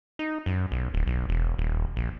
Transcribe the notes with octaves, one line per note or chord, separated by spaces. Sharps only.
D#4
F#2
B1
D1
B1
E1
D#1
A#1